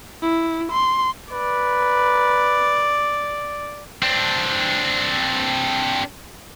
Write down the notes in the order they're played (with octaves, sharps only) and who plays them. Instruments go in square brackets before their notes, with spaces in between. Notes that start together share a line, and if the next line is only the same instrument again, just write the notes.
[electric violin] E4
C6
[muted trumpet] B4 [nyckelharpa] D5
[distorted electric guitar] C4 D4